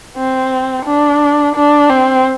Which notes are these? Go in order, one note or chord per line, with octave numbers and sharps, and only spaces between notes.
C4
D4
D4
C4